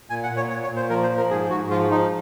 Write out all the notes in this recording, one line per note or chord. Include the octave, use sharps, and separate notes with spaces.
A#2 G#5
F#5
A#2
C#5
A#2 C#5
C#5
A#2
C5
F3 A#4
C5
F3
A#4
G#2 G#4
G#2 F#4
F3 F4
F3 D#4